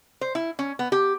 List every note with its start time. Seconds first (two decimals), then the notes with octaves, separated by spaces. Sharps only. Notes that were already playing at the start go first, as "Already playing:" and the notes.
0.21 C5
0.35 E4
0.59 C#4
0.79 B3
0.92 G4